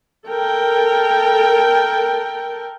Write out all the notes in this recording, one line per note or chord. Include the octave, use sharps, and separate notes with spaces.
A4 A#4 G5